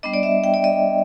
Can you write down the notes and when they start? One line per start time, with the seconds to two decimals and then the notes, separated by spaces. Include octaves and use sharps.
0.03 G3 B3 D4 D#5
0.14 D5
0.23 E5
0.44 G5
0.54 D5
0.64 D#5